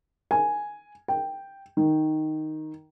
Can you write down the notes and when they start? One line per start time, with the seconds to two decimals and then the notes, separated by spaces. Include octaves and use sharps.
0.31 G#5
1.08 G5
1.77 D#3